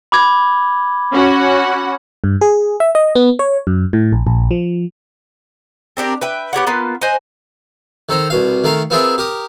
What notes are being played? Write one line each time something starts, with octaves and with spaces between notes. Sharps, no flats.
B5 D6 G#6
C#4 F#4 F#5
G2
G#4
E5
D#5
B3
C#5
F#2
A2
A#1
A#1
F3
C4 D4 G4 A#4
B4 E5 G5
B3 G4 C#5 F#5
A#3 B3 F4 B4
C5 D#5 F#5 G#5
D#3 A4 C5 A#5
C2 B2 F5
D#3 A3 A#4 F5
B3 C4 F4 G#4 A#4 E5
G4 A#4 D#6